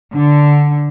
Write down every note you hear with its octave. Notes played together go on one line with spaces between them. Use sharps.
D3